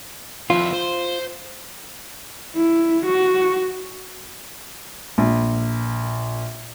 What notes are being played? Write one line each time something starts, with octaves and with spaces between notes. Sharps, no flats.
F2 E4 F4
C5
E4
F#4
A#1